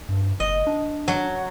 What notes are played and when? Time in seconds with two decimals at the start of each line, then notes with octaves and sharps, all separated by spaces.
0.09 G2
0.40 F#1 D#5
0.67 D4
1.08 F#3